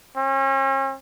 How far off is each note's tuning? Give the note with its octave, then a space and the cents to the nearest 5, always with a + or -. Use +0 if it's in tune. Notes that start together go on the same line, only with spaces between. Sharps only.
C#4 -40